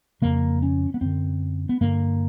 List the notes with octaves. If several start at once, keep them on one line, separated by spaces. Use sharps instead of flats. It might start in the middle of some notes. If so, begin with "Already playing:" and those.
F2 C#3 A#3
C#4
B3
F#2 D3 C4
B3
G2 D3 A#3